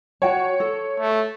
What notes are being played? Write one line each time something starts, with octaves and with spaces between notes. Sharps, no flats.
F#4 C#5 G5 A5
A4
A3